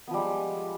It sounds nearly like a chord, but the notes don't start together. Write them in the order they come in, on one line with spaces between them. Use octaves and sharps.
B3 F3 G3 G#3